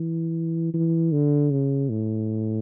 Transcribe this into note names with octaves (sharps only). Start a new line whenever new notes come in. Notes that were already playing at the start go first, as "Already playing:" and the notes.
Already playing: E3
E3
D3
C#3
A2